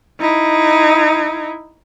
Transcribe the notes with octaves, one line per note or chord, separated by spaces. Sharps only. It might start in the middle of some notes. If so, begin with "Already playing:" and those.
D#4 E4